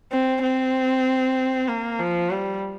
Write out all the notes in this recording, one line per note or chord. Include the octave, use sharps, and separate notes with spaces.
C4
C4
A#3
F3
G3